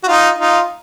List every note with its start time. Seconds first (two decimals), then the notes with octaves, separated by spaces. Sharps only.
0.03 F#4
0.08 D#4 F4
0.38 D#4 F4